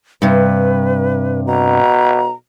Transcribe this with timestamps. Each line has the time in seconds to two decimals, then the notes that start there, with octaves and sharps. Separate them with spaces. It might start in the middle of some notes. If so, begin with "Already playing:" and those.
0.22 G2 C3 B4
1.47 B2 A#5